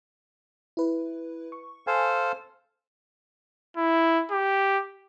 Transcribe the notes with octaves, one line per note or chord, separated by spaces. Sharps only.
E4 B4
C#6
A4 C5 F5 G#5
E4
G4